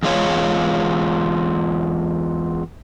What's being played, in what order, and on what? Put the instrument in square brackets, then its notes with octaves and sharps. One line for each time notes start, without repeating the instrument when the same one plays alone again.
[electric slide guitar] E2 G#3 F4 C#5